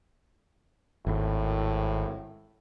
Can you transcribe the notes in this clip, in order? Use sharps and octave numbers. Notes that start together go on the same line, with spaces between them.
G#1 A2